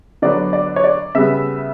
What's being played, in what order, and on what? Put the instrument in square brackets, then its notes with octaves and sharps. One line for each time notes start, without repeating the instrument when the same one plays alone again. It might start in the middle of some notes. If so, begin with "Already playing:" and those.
[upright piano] D3 F#3 B3 D5
D5
C#5
D5
C#3 G3 B3 E5